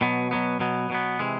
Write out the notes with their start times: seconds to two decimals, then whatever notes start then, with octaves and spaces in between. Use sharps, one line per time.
0.01 B2 F#3 B3
0.31 B2 F#3 B3
0.60 B2 F#3 B3
0.90 B2 F#3 B3
1.19 C3 E3 G#3